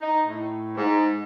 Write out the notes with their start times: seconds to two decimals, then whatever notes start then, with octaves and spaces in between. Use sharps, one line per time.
0.01 D#4
0.27 A2
0.76 G#2